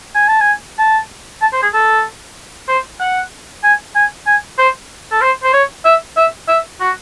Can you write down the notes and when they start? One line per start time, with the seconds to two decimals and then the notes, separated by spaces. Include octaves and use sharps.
0.15 G#5
0.28 A5
0.40 G#5
0.78 A5
1.42 A5
1.53 C5
1.63 G#4
1.74 A4
2.68 C5
3.00 F#5
3.64 G#5
3.95 G#5
4.27 G#5
4.58 C5
5.11 A4
5.21 C5
5.43 C5
5.53 C#5
5.85 E5
6.17 E5
6.48 E5
6.80 F#4